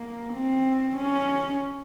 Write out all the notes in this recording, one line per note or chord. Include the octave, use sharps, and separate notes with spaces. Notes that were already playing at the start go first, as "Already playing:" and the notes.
Already playing: A#3
C4
C#4